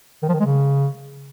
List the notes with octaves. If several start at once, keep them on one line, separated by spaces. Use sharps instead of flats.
D#3
F3
D#3
G#3
C#3